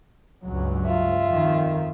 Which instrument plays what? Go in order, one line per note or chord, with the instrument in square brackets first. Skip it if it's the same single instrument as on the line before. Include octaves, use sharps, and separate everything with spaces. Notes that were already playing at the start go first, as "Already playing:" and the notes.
[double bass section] C#2 G2 F#3
[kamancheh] F4 E5
[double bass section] F2 D#3